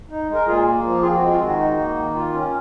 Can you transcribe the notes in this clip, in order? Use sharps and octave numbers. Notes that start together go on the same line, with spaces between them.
D#4
G#3
A#4
A#2 F4 G#4
A#3
F3
C4 F4 G#4
F#4
G#3
F4
D#3 F#4
D#4
A#3
D#3
F4
C#4